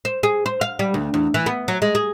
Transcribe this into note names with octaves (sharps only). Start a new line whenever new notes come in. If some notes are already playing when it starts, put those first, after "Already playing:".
C5
G#4
C5
F5
G3
D2
E2
E3
B3
F#3
G#3
G#4